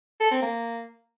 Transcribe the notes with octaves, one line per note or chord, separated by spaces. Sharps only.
A4
C4
A#3